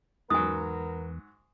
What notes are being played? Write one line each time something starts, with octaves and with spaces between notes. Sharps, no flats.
E2 G#2 F#3 B3 A#4 G#5 D#6